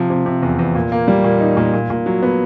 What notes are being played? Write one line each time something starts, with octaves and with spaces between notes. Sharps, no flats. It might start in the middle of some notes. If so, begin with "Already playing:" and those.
Already playing: C3 F3
C3
C3
E2
E2
A#2
A#3
G3
A#2
D#4
A#2
A#2
A#2
F#3
B3